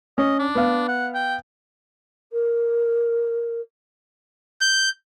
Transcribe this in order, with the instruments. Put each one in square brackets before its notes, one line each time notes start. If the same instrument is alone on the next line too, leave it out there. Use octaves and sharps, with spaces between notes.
[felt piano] C#4 [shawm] D#5
[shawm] D4
[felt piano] B3 F5
[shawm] F#5
G5
[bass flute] A#4
[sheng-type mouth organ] G6